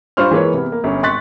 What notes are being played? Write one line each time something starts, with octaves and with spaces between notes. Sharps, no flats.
G2 F4 C5 C#6 F6
E3 G#3 A#3 B4 C#5
C3 B3
A#3
G1 C#4
G#1 C6 C#6 F#6 A6 B6